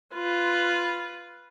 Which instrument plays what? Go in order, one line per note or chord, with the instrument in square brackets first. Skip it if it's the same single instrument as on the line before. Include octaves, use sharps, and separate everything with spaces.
[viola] F4 B4